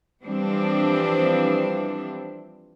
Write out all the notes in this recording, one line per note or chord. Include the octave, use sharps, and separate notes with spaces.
E3 F3 G3 C4 D4